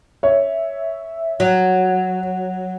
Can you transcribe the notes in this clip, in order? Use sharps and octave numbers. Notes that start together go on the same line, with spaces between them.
C#5 E5
F#3 F#4